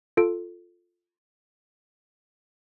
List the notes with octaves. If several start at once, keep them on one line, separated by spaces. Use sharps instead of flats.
F4 A4 D7